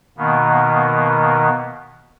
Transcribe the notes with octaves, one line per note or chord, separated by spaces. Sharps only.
B2 D#3 A#3 B3